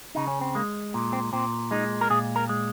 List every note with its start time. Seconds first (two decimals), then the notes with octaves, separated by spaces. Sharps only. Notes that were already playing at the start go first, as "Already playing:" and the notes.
0.15 C#3 D#4
0.28 C#4
0.41 C4
0.55 G#3 A#3
0.94 A#2
1.13 C4
1.33 A#2 C4
1.71 G#3 D#4
2.01 A#4
2.10 A#2 G#4
2.36 A#4
2.49 G#3